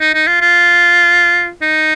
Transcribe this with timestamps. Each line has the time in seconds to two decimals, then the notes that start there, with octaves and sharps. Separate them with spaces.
0.01 D#4
0.14 D#4
0.27 F4
0.41 F4
1.62 D#4